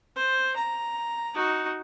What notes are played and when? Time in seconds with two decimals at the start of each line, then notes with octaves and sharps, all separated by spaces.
0.16 C5
0.56 A#5
1.35 D#4 F#4